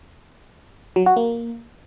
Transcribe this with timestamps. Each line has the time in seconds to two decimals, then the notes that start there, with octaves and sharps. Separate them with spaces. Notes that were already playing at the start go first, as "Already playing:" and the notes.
0.96 F#3
1.06 F#4
1.16 A#3